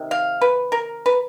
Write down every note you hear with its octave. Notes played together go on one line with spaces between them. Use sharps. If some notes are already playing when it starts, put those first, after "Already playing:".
Already playing: C3 D#3
F5
B4
A#4
B4